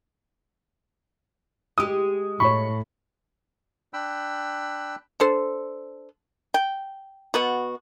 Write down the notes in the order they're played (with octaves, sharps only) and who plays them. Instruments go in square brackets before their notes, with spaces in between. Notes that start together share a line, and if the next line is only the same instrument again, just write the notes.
[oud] G#3 G4 [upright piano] D#6
[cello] A2 [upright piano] C#5 B5 [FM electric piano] C#6
[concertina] D4 G5 B5 E6 F#6
[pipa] D4 A4 C5
G5
B2 B3 F#4